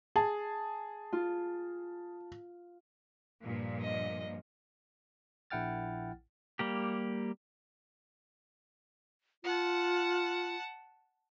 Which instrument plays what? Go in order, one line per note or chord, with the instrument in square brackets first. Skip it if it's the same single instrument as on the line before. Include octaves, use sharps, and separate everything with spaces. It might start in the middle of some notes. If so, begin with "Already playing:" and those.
[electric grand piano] G#4 [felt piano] A5
[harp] F4
[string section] G2 A#2 F3
[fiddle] D#5
[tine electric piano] A#1 E4 F#5 G5 F6 A6
[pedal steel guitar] G3 A#3 G4
[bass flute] F4 [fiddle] F#5 A5